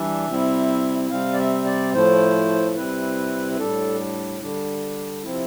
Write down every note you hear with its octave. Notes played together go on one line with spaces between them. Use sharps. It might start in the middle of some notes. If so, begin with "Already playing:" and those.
Already playing: E3 G3 D4 E5
C3 G3 C4 E4
C3 G3 C4 F5
D5
E5
D5
A2 F3 A3 E4 C5
C3 G3 C4 E4 B4
B4
A2 G3 D4 A4
D3 G3 D4
C3 F3 C4 E4